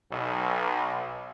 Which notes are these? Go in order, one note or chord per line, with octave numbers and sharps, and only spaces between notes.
B1